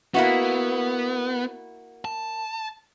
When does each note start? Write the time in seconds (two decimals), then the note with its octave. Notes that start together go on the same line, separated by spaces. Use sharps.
0.14 A#3 B3 E4 F#4
2.05 A5